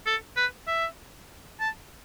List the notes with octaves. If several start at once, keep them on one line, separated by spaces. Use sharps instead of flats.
A4
B4
E5
A5